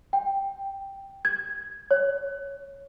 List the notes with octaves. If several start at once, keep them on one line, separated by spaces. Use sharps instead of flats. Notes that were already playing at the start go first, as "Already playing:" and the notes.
G5
G#6
C#5